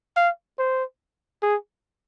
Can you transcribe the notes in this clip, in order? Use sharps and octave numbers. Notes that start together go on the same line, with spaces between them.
F5
C5
G#4